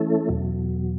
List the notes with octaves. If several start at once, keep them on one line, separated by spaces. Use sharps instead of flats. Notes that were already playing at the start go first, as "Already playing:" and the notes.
Already playing: E3 A3 C#4 E4 A4
E2 B2 F#3